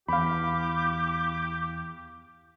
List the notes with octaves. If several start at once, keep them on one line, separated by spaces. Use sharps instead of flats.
E2 G4 F5 B5 D6